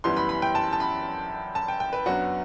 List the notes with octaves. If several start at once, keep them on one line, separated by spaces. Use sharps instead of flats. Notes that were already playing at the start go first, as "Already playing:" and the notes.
F#2 E3 G3 B3 C6
B5
B5
G5
A5
A5
B5
A5
G5
G5
B4
F#2 F#3 B3 D4 F#4